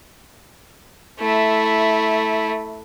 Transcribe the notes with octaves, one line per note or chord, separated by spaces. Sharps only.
A3 E4